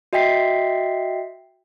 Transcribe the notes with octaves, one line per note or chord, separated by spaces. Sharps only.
F#4 D#5 E5 G5 B6 C7